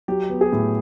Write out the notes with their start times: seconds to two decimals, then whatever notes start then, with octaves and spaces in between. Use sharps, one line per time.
0.08 F#3 G4
0.30 B3
0.41 G#4
0.52 A2